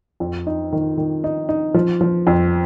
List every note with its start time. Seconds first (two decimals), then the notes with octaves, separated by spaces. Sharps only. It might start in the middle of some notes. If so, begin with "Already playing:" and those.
0.20 F2
0.47 D#4
0.72 D#3
0.97 D#3
1.24 D#4
1.49 D#4
1.74 F3
2.01 F3
2.27 F2